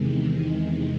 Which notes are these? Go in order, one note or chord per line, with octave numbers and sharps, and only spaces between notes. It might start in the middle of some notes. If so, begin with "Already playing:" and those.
Already playing: E2 C3 D#3 G#3